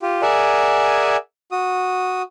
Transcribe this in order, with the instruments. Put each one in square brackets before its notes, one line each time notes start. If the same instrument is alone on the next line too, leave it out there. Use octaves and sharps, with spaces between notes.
[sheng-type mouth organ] F4 G4
G#4 A#4 D5 E5 F#5 G#5
F#4 D#6